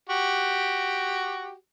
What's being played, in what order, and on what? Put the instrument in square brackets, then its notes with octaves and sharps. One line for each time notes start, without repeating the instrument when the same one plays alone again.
[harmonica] F#4 G4